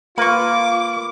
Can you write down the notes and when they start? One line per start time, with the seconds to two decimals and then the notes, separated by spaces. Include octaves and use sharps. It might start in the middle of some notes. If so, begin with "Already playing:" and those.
0.18 A#3 F4 B4 C#6 D6